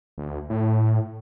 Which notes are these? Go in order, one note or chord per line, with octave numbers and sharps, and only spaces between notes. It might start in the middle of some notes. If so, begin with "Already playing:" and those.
D2
A2